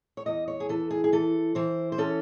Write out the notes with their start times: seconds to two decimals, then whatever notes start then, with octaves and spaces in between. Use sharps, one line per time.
0.17 C#5
0.26 E2 D#5
0.48 C#5
0.60 G#4
0.69 E3 A4
0.91 G#4
1.04 G#4
1.12 E3 A4
1.55 E3 C5
1.92 C5
1.98 C#4 A4